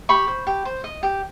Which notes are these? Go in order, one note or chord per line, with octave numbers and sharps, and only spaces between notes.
G4 B5 C#6
C5
G4
C5
D#5
G4